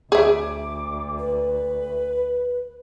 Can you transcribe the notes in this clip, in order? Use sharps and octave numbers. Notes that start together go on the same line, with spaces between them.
D2 G#4 E5 D6
B4